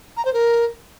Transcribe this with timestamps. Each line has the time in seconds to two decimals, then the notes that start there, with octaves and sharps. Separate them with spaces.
0.17 A#5
0.25 C5
0.34 A#4